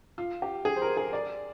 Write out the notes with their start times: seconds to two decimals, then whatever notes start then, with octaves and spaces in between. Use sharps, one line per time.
0.18 F4
0.42 G4
0.65 G#4
0.76 C5
0.82 A#4
0.97 G#4
1.13 D5